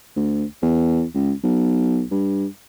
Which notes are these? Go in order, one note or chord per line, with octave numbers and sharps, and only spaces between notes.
D2
E2
C#2
B1
G2